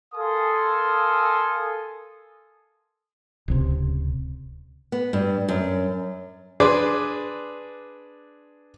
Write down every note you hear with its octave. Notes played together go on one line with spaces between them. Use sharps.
A4 A#4 F5 G#5 C6 D#6
D1 C#2 C3
B3
G2
F#2
D4 G#4 B4 C6 D6